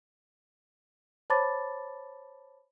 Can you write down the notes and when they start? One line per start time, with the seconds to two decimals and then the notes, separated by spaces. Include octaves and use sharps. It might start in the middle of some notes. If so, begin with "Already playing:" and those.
1.30 C5 C#5 A5 B5 D6 A6